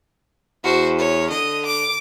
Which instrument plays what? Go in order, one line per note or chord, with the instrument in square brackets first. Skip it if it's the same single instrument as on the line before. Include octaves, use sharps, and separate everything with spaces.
[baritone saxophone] E2 [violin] F#4 C5
[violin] C#5
[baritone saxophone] D3 [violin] D#5
[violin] D6